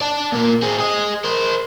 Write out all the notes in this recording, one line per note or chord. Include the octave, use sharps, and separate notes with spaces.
D5 A5
A#2 A#3
C4 G#4
G#4 D#5
A#4 C5